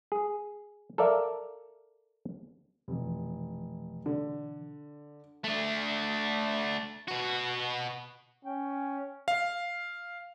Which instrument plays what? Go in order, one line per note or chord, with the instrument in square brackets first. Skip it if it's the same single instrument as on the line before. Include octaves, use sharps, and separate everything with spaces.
[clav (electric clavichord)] G#4
A4 A#4 D5 E5 F5
[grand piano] F1 [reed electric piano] B2 E3
[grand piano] D3
[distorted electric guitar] A3 D4
B2 F#4
[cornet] C#4 [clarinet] G5
[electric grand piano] F5